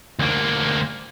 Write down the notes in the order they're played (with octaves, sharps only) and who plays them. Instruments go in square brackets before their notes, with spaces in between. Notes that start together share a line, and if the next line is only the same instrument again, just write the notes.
[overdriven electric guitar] D2 A#3